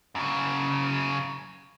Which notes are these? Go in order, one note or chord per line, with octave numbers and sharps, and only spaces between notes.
F#2 C#3